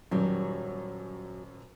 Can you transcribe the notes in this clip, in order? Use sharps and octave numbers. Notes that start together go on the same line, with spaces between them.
D#1 F#2 F#3 G3